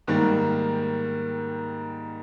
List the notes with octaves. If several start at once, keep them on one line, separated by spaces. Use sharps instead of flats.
G#2 D#3 G3 A#3